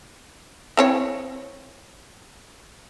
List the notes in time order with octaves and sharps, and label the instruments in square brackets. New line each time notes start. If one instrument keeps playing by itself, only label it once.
[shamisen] E3 C4 C#5